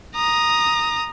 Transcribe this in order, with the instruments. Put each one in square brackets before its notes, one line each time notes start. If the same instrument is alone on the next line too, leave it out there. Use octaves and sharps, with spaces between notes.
[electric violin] A#5 D#6